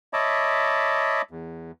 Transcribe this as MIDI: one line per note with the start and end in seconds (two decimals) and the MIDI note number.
0.13 1.22 73
0.13 1.22 75
0.13 1.22 76
0.13 1.22 81
0.13 1.22 83
0.13 1.22 86
1.31 1.71 40